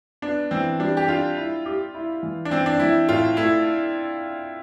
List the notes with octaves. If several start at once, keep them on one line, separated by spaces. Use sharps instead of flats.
B3 D4
E3 C4
G3 D4
G4
D4 F4
E4
G4
E4
E3
D4
E3 C4
D4
E3 E4
A2 F4
A3 E4